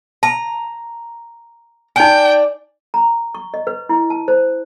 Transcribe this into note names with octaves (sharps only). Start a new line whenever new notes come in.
A5 A#5
D4 D#4 G5 G#5
A#5
C#6
D#5
B4
E4
A5
C5